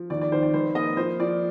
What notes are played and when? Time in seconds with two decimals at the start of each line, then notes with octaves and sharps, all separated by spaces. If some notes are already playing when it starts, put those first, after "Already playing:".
Already playing: F3
0.10 D#2 D5
0.21 D5
0.32 D#3 C5
0.42 D5
0.53 F1 C5
0.75 A#3 D#5
0.97 F3 C5
1.19 F3 D5